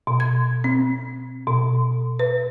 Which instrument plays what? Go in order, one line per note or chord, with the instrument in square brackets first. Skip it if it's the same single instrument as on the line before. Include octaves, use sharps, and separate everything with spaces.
[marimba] B2
G#6
C4
B2
B4